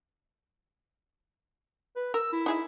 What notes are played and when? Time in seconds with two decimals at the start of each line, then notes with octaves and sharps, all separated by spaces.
1.96 B4
2.14 A#4 E6
2.33 E4
2.46 D#4 G#4 E5